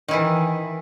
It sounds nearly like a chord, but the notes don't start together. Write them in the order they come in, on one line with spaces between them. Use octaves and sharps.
D#3 E4 E3